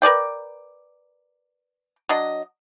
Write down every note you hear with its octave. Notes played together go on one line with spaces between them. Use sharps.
A#4 B4 D5 G5
F#3 D4 D#5